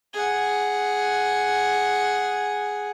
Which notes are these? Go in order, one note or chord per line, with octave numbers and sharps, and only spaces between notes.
G#4 F#5